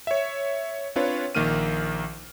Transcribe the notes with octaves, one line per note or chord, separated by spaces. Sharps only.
C#5 E5
C4 D4 F4 B4 C#5
A#1 D#3 A#3 F6 D#7